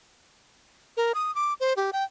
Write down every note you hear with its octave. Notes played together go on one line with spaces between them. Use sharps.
A#4
D#6
D6
C5
G4
G5